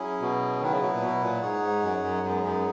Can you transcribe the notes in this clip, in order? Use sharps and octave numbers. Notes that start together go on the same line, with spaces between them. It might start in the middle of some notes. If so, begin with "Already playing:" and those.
Already playing: F#3 C#4 E4 G#4
B2
D#3 F#3 B3 E4 B4
C#3
B2
A#2
B2
A#2
G#2 D#4 G#4 C#5 F#5
G#2
F#2
F#2
F#2 G#3 B3 D#4 G#4
F#2